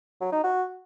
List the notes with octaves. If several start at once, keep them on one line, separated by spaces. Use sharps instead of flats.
F#3
D#4
F#4